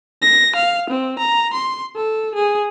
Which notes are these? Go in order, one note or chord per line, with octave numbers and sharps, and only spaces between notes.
A#6
F5
C4
A#5
C6
A4
G#4